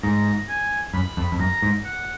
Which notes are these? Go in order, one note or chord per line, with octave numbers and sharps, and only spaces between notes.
G#2 A#5
G#5
F#2 B5
F2
F2
F#2 A#5
G#2
F#5